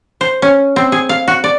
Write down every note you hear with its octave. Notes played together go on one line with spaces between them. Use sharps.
C5
C#4
C4
G#4
F5
F#4
D5